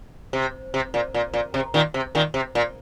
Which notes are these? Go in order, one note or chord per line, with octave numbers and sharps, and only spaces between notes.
C3
C3
A#2
A#2
A#2
C3
A#2 D#3
C3
A#2 D#3
C3
A#2